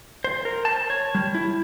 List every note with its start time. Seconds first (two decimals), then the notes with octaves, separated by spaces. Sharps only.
0.24 C5
0.45 A#4
0.65 A5
0.90 C#5
1.15 G3
1.35 E4